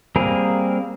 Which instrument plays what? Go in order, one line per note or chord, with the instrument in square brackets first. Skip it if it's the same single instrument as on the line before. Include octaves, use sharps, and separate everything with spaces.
[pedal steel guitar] G3 A#3 C4 G#4 A#4